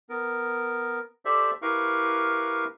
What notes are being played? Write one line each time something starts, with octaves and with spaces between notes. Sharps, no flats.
B3 A#4
G4 A4 C5 D5 E5
E4 G4 A#4 B4 F5 C#6